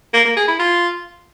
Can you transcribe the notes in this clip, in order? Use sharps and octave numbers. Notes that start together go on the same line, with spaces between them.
A#3
A#3
G#4
E4
F4